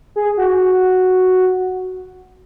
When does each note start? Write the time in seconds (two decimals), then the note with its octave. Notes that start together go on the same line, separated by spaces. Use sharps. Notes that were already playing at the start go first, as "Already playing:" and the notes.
0.16 G#4
0.37 F#4